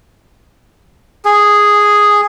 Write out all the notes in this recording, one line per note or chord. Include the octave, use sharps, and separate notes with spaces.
G#4